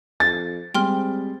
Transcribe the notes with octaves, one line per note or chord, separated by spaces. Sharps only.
F2 A6
G3 G#3 C4 G5 C6 F6